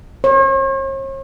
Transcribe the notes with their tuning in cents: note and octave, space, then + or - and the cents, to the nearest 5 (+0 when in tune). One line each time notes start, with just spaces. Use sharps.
C#5 -45